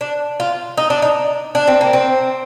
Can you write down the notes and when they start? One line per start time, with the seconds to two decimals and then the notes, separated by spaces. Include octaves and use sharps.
0.01 D4
0.40 F4
0.77 D#4
0.90 D4
1.02 D#4
1.55 D4
1.67 C4
1.81 A#3
1.93 C4